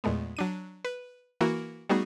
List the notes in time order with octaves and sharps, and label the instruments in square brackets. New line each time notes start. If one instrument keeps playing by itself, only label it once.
[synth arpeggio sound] E2 A#2 G#3 A3 B3
F#3 D4 D#7
B4
E3 A#3 E4 F#4 A#4
G3 A3 B3 D#4 F#4 G#4